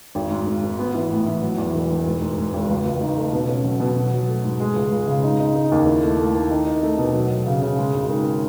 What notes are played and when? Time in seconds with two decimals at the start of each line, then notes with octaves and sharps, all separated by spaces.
0.15 G#1
0.30 G#2
0.47 G#1
0.63 G#1
0.79 B3
0.94 E3
1.11 A2
1.26 E3
1.42 F#3
1.58 E2
1.74 E1
1.90 E1
2.06 G#2
2.22 G#2
2.38 G#2
2.53 G#1
2.69 C#2
2.86 C#2
3.01 D#4
3.17 A3
3.33 B2
3.49 C#4
3.65 F#3
3.80 B2
3.96 F#3
4.12 F#3
4.28 A3
4.44 G#2
4.60 G#3
4.76 C#2
4.92 C#2
5.08 C#3
5.24 D#4
5.40 D#4
5.56 D#4
5.72 D#2
5.87 E4
6.03 A3
6.19 A3
6.35 D#3
6.51 D#4
6.67 D#4
6.83 A3
6.98 B2
7.14 F#3
7.31 F#3
7.47 C#3
7.62 C#3
7.78 G#3
7.94 G#1
8.10 D#3